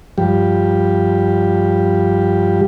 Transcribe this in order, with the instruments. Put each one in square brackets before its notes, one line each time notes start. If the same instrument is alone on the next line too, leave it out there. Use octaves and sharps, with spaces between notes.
[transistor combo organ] G2 F3 G3 G4